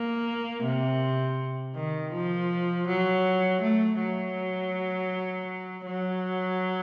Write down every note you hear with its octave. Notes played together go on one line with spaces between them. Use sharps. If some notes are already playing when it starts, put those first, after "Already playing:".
Already playing: A#3
C3
D#3
F3
F#3
A3
F#3
F#3